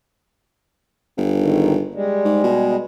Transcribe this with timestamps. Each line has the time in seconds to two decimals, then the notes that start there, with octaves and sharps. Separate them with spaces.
1.18 G1
1.38 G#2 D#3
1.95 G3 G#3
2.25 G#2
2.44 B2